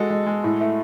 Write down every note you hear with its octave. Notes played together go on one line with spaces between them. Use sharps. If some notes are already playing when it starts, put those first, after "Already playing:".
Already playing: G#3 F#4 A4
G#3
G#3
A2
A3